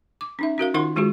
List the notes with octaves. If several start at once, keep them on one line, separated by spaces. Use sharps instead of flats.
D6
C#4 D#4 E5
C#4 F#4 A#4 F5
D#3 D#4 F4 A#4 F#5 C6
D#3 G#3 F4 F#4 G#4